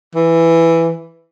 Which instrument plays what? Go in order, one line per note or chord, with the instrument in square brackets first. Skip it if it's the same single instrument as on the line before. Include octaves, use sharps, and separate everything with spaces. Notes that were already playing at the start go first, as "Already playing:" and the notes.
[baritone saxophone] E3